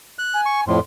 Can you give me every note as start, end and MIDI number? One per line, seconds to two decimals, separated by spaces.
0.19 0.41 90
0.34 0.65 80
0.46 0.61 85
0.67 0.79 41
0.67 0.79 45
0.67 0.80 84